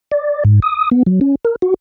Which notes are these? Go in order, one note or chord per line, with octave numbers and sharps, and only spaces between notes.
D5
G#2
D#6
B3
F#3
C#4
A#4
F#4